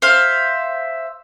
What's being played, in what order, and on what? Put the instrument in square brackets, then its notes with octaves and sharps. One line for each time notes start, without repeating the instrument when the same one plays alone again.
[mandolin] C5 E5 F5